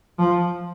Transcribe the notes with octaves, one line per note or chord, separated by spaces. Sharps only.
F3